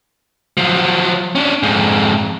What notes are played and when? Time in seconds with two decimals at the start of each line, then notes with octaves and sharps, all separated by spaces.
0.57 F3 F#3
1.35 C#4 D4
1.63 F2 G#2